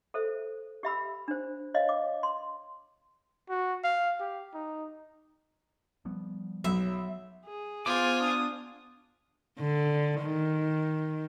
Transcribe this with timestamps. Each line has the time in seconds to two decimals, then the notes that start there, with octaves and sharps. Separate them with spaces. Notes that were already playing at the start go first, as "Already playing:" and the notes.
0.14 A4 C5 E5
0.83 G4 E5 B5 E6
1.28 D4 C5
1.74 C#5 D#5 F5
1.89 D6
2.23 C6
3.49 F#4
3.84 F5
4.20 G4
4.54 D#4
6.05 F3 G3 B3
6.64 B1 F#3 E5
7.45 G#4
7.86 B3 F4 C5 G#5 D6
8.20 D4 D#6
9.59 D3
10.22 D#3